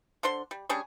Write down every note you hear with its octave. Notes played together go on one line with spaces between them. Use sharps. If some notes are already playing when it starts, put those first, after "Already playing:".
D3 D4 C5 C6
G3
G3 C#4 D4 G#4